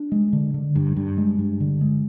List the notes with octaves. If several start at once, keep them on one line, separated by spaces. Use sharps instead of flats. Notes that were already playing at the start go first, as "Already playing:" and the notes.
Already playing: D4
G#3
D3
D3
G2
G2
G#3
G2
D3
G#3